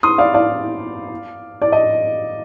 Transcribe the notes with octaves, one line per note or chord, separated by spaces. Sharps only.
C6 D#6
D5 F5
D5 F5
D5
D#5